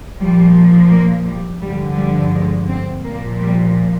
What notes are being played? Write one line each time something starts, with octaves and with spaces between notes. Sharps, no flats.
A#2 F3 G3
A#3
G3
G2 D3 F3 G3
G3
G#3
C4
A#2 F3 A#3
G3